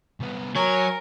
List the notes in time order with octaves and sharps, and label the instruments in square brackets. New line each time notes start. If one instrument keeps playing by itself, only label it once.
[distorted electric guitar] C2 B3
[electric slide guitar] F#3 [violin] A#4 [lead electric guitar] C#5 [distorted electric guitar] G#5